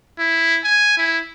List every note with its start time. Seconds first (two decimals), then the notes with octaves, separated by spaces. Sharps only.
0.19 E4
0.64 G#5
0.97 E4